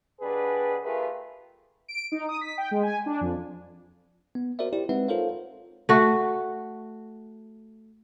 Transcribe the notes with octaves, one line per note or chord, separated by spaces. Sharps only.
B2 G3 D4 G#4 B4
A3 F4 G4 G#4 A#4 B4
D7
D#4
D#6
B6
G5
G#3
G#5
D4
F2
B3
F#4 A#4 C5 D5 E5
E4 G4 C5 D5
G#3 C4 D#4 B4 E5 F#5
F4 A4 A#4 C5 C#5 F5
A3 F#4